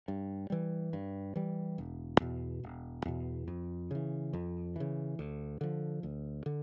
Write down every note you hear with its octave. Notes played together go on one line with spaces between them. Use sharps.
G2
E3 G3
G2
E3 G3
E1
E2 B2
E1
E2 B2
F2
C#3 E3
F2
C#3 E3
D2
D3 F3
D2
D3